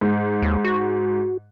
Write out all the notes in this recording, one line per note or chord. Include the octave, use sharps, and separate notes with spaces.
G#2
D#2
F#4